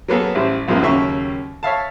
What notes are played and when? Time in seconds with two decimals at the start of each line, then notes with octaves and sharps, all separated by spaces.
0.08 F#3 A#3 B3 G#4 A4
0.35 A1 G3 E4 C5
0.68 B1 F#2 F3 G#3 A#3
0.81 D#2 C#3 F#3 A#3 E5 C#6
1.63 C#5 E5 F5 A5